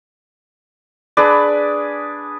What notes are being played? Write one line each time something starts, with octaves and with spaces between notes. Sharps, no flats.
D4 G#4 B4 D5